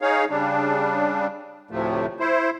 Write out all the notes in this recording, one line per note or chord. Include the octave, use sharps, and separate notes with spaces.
D#4 G#4 C#5 F5
C#3 G3 D4
D2 A2 C3 F3 A3
E4 C5